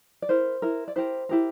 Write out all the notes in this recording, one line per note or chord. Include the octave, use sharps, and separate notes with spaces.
D5
E4 A#4 C5
E4 A#4
D5
E4 G4 A#4 C5
E4 G4 A#4